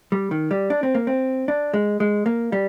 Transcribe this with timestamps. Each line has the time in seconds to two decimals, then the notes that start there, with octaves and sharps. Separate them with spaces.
0.12 G3
0.31 D#3
0.51 G3
0.70 D4
0.83 C4
0.95 A#3
1.07 C4
1.48 D4
1.74 G#3
2.00 G#3
2.26 A#3
2.52 G3